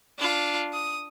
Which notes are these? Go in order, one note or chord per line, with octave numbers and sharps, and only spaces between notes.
D4 F4
D#6